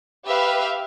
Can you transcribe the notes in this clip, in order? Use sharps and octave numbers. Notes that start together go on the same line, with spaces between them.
G4 B4 E5 F5